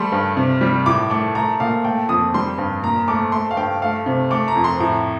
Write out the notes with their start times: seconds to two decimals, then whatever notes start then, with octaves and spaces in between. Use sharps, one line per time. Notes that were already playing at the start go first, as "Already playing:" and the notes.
Already playing: G3 A3 C6
0.12 G2
0.37 C3
0.61 G3
0.86 A2 D6
1.10 A3 D6
1.35 A3 A#5
1.60 A#2 F5
1.84 A3 G5
2.09 F2 D#6
2.34 G3 C6
2.58 G2
2.83 A#2 A#5
3.08 A3 D6
3.32 A3 C6
3.51 F5
3.57 G2 G5
3.82 A3 F5
4.06 C3
4.30 A3 D6
4.48 A#5
4.56 F2
4.64 C6
4.80 A2 A#5